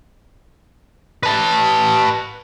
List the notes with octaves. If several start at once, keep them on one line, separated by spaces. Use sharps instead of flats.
B4 A5